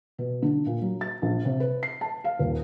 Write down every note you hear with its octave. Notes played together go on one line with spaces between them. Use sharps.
B2
D3
A#2
F#3
A6
A#1
C3
B4
C7
A5
F5
D#1